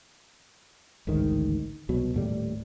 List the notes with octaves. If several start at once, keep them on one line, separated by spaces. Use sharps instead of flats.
A1 D2 G#2 D#3
C2 B2 F#3
D#1 A2 G3